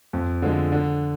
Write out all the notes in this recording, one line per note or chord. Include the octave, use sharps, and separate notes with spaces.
F2
D3 F3 G#3
D3